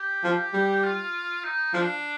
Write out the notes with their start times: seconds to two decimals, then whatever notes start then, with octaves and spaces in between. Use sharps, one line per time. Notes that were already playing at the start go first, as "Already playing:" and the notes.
Already playing: G4
0.24 F3
0.53 G3
0.83 F4
1.44 D#4
1.74 F3 D4